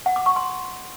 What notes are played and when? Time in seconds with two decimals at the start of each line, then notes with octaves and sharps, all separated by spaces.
0.06 F#5
0.16 D6
0.26 C#6
0.36 C6